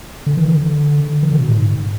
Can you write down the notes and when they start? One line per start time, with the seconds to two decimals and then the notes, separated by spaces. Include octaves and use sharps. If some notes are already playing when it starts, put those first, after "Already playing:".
0.26 D3
0.37 E3
0.48 D3
1.23 E3
1.31 D3
1.40 B2
1.48 A2
1.56 G#2